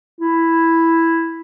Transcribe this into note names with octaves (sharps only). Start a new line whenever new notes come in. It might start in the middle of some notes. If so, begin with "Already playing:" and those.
E4